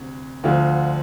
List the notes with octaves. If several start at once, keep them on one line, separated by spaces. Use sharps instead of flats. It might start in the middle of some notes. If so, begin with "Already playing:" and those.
Already playing: D2 C3
D2 D3 F3 F4